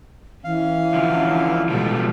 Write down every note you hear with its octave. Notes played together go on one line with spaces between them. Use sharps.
E3 C#4 F5
D3 F3
B2 F3 G3 G#3 G4 A4